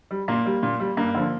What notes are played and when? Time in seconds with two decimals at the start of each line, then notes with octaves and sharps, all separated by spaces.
0.11 G3
0.28 A#2 A#3
0.46 G3
0.63 A#2
0.80 G3
0.97 G2 A#3
1.14 D3 F3